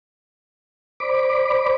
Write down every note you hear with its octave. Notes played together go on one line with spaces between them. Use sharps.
C5 D5 B5 D6